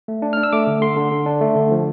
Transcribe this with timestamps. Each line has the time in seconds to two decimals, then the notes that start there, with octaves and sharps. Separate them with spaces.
0.08 A3
0.22 D4
0.33 D4 F6
0.43 E6
0.53 A3 D6
0.67 D3
0.81 D3 C6
0.97 D3
1.12 D3
1.26 D4
1.41 A3
1.56 D3
1.71 F3